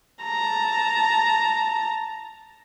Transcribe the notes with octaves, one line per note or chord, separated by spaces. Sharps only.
A5 A#5